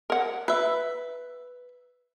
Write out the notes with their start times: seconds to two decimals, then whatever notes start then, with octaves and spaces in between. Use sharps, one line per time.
0.10 A#4 F#5
0.48 B4 E5